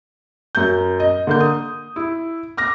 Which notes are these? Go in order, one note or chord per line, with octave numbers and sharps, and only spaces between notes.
F#2 G6
D#5
D3 A#3 G6
D#6
E4
D6 F6 A#6